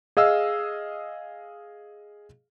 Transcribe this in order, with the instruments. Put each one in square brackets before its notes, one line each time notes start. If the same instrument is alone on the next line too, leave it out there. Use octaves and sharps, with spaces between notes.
[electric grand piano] G#4 D#5 F5 E6